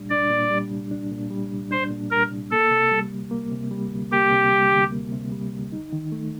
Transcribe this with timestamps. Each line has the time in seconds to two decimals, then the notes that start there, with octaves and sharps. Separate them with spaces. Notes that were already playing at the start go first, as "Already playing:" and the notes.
Already playing: C2 A#2 G3 D4
0.10 D4 D5
0.30 A#2
0.51 G3
0.71 C2
0.91 D4
1.11 A#2
1.31 G3
1.50 C2
1.71 D4 C5
1.91 A#2
2.11 G3 A#4
2.31 C2
2.51 A#3 A4
2.71 C3
2.91 G3
3.11 D2
3.31 A#3
3.51 C3
3.71 G3
3.91 D2
4.12 A#3 G4
4.31 C3
4.52 G3
4.71 D2
4.92 A#3
5.12 C3
5.32 G3
5.52 D2
5.72 D#4
5.93 D#3
6.12 A3